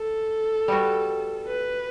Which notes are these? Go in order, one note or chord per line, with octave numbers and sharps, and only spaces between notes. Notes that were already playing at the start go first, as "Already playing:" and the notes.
Already playing: A4
G3 B3 F#4
B4